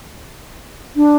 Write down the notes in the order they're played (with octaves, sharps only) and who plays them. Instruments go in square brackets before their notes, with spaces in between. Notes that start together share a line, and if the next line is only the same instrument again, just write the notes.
[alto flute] D4